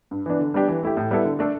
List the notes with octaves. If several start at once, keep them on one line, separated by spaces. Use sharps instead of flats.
G2
E3 B3 D4
D3
G3 B3 D4 G4
E3
A3 E4 G4
A2
G3 B3 E4 A4
D3
A3 D4 A4